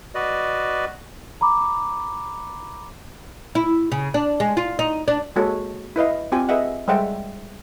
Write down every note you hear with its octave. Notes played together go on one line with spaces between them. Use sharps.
F#4 B4 D5 D#5
A#5 B5 D6
E4
C#3
D4
G#3
F4
D#4
D4
G#3 A#3 F#4 A4 C#5
E4 B4 D#5 F5
C4 F4 G4 G#5
G#4 B4 D#5 E5 F#5
G3 G#3 C5 E5 F#5 G5